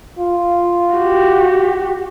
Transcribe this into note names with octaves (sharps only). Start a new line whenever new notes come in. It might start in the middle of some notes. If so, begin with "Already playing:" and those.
F4
F#4 G4